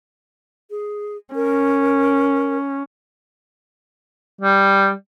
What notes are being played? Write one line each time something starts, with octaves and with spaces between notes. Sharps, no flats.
G#4
C#4 A#4
G3